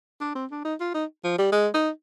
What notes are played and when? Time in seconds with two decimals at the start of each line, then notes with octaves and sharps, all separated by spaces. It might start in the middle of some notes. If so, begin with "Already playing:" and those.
0.21 D4
0.35 C4
0.51 D4
0.65 D#4
0.80 F4
0.94 D#4
1.24 F3
1.38 G3
1.52 G#3
1.74 D#4